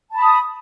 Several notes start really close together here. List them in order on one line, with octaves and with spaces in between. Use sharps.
A5 B5 D#6